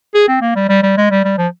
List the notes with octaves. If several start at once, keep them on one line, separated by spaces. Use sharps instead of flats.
G#4
C4
A#3
G3
G3
G3
G#3
G3
G3
F3